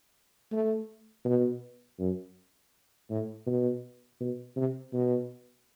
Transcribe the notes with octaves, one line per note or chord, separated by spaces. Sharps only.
A3
B2
F#2
A2
B2
B2
C3
B2